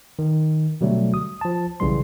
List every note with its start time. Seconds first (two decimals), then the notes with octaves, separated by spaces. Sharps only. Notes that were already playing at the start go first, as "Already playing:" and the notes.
0.19 D#3
0.81 B2 D3 F#3 G3 A3
1.14 D#6
1.41 F3 A5
1.80 B1 C#3 E3 G3 C6